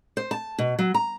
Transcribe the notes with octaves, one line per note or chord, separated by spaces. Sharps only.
C5
A5
B2
F#3
A#5